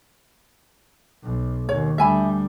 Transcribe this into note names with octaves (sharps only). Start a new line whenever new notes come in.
B1
D#2 B2 C#5
D2 G3 E5 G#5 B5